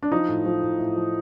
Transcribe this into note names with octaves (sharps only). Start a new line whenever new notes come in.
D4
F3 D#4
A2
F3
A2
A2
F3